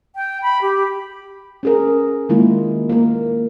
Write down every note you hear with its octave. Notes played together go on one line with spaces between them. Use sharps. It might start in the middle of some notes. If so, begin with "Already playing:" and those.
G5
B5
G4
C#4 G#4 A#4
D#3 G#3 A#3 E4 F4
A#3 A#4